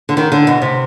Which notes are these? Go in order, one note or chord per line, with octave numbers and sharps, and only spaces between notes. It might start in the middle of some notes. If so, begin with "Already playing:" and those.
D3
D#3
D3
B2
C3